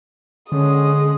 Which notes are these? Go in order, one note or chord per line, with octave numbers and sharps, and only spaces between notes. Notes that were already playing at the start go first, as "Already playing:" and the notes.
D3 G#3 C#4 D#6